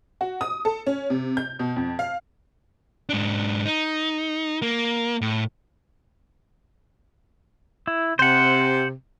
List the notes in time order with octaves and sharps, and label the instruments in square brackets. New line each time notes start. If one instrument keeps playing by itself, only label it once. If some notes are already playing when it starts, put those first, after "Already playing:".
[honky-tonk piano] F#4
D#6
A4
C#4
C3
G6
B2
F2
F5
[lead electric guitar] G#2 D4
D#4
A#3
A2
[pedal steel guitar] E4
[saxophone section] C3 [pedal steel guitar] C5 F#5